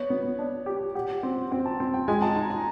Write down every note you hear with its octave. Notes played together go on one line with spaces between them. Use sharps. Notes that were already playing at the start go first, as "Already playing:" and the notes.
Already playing: B3 C#5
B3
D4
G4
G4 F#5
C4
C4 G5
A5
C4
G5
G#3 G#5
A5
D#4 A#5
A#5